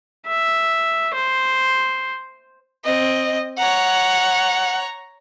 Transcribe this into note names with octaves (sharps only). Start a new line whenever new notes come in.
E5
C5
C4 D#5
C#5 F#5 A#5